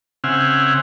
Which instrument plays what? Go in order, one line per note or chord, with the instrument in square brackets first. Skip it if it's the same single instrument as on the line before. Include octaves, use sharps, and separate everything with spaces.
[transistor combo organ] C#3 C4 E5 F#5 G#5 F6